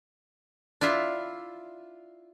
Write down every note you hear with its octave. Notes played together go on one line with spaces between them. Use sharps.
D4 E4 F4 E5